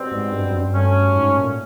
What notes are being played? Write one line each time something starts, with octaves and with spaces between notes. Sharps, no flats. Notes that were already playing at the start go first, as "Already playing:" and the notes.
Already playing: B2 G3 C4
G#2
G2
F#2
G2
F#3 A3 C#4
G#2
A#2